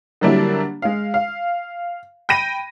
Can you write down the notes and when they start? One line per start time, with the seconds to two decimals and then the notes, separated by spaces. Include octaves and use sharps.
0.21 D3 F#3 G3 A#3 D4 E4
0.82 G#3 F5
1.14 F5
2.29 G5 B5 A#6 D#7